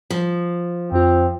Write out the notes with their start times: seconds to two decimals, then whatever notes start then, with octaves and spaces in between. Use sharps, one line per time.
0.10 F3
0.92 F2 C4 F4